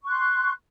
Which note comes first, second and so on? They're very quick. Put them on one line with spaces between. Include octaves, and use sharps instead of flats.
C#6 F#6 C6